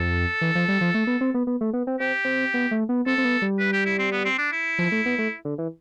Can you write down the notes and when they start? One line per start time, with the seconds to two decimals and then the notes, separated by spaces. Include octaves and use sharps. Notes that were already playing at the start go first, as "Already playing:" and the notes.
Already playing: F2 A4
0.41 E3
0.55 F3
0.68 G3
0.81 F3
0.94 A3
1.07 B3
1.21 C4
1.34 B3
1.47 B3
1.61 A3
1.73 B3
1.87 C4
2.00 C4 G4
2.25 C4
2.54 B3
2.71 A3
2.89 B3
3.06 C4 A4
3.18 C4
3.24 B3
3.42 G3
3.59 B4
3.73 G4
3.85 E4
3.99 C4
4.12 B3
4.25 C4
4.38 D4
4.52 E4
4.79 F3
4.92 A3
5.06 B3
5.18 A3
5.45 D3
5.58 E3